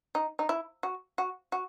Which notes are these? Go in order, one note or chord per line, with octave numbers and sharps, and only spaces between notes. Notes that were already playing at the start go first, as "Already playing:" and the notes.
D#4
D#4
E4
F#4
F#4
F#4